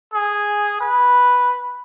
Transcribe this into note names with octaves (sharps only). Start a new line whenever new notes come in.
G#4
B4